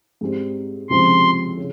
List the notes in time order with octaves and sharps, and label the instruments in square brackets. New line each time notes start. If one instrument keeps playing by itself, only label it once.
[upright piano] G#2 G3 C4 G4
[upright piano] C#2 C3 F3 C4 [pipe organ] C6
[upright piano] C#3